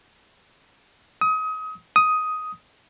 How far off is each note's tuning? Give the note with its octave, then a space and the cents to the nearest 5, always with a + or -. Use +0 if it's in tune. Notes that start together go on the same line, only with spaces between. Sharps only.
D#6 +30
D#6 +10